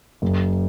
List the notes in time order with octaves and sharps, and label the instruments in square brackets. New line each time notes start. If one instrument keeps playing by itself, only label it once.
[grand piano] F#1